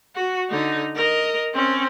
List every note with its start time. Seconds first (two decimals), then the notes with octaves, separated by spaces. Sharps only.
0.16 F#4
0.50 D3 D#4
0.96 A#4 D#5
1.54 C4 C#4